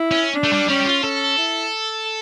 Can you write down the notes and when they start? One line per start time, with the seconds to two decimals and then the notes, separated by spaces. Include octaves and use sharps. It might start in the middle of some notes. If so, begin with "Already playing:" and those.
Already playing: E4
0.11 C#4
0.34 D4
0.44 A3
0.52 G3
0.68 G3 C#4
0.80 G4
0.86 F4
1.03 C#4 A4
1.38 E4